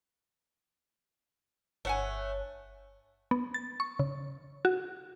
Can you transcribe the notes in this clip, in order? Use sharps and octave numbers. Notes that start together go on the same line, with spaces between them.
G1 A3 C#5 F#5 G#5 F#6
B3
A6
C#6
C#3
F#4